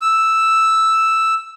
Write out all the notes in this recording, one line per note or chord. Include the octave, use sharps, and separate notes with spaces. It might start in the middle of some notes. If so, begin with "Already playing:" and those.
E6